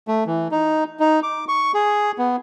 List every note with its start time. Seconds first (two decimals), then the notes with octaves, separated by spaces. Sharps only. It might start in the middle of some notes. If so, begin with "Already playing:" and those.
0.08 A3
0.26 E3
0.52 D#4
1.00 D#4
1.23 D6
1.48 C#6
1.74 G#4
2.18 B3